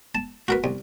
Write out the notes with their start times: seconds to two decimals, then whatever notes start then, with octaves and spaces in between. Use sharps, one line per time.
0.15 A5
0.48 F#4 A#4 B4
0.64 C2